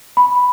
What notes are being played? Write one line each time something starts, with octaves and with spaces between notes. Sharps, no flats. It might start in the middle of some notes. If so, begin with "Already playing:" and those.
B5